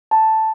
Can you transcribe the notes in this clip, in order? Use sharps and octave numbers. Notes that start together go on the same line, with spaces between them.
A5